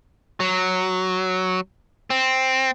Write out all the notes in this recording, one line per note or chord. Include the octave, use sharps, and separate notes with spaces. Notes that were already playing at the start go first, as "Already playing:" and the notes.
F#3
C4